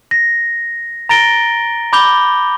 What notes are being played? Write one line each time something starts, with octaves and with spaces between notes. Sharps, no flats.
A#6
A#5 A6 A#6 D7 G7
B5 D6 G6 F7 G7